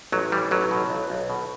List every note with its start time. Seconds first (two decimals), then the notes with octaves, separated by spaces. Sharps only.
0.12 A1 F#3
0.32 E3 G3
0.51 A1 F#3
0.71 B2
0.90 B1
1.10 B1
1.30 B2